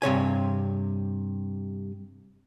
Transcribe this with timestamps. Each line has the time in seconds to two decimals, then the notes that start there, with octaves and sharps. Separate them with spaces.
0.02 G2 C3 C#5 G#5